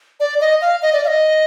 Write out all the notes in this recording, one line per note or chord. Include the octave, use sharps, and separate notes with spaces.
D5
D#5
F5
D#5
D5
F5
D#5